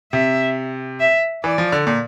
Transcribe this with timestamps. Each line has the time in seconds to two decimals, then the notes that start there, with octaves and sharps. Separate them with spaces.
0.13 C3 E5
1.00 E5
1.44 E3 D5
1.58 F3
1.72 D3
1.87 A#2